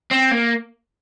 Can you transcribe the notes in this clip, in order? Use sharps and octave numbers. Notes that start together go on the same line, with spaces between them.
C4
A#3